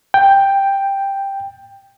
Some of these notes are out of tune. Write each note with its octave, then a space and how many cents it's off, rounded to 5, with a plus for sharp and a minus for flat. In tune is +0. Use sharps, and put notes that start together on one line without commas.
G5 +5